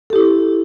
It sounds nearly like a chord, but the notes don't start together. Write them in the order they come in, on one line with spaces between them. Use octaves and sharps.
A4 G4 E4